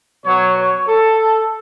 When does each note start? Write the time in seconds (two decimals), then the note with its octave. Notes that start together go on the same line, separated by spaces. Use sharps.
0.25 B2 F#3 C#5
0.56 C#5
0.88 A4